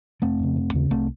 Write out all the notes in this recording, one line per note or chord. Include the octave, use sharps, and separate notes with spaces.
F1 A3 C4
F2 C#3
F1
D#2 C#3
C2 A3 C4